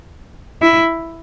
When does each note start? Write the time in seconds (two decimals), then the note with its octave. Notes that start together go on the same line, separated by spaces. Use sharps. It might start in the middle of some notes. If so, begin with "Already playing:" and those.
0.62 E4